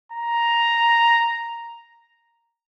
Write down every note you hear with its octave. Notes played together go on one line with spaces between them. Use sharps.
A#5